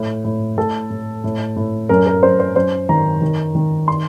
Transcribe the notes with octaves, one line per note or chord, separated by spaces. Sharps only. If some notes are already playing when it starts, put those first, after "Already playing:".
Already playing: A2
A2
A2 A4
A2
A2
A2
F#2 A#4
A#4
F#2 C5
C5
F#2 C5
D#3 A#5
D#3
D#3
C6